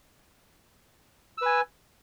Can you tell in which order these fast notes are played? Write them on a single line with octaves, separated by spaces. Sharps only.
E6 B4 G#5